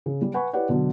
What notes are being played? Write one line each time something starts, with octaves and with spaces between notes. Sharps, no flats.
C#3
G3
B4 F#5 G#5 B5 C#6
E4 G4 B4 C#5 D5 F#5
B2 D3 F#3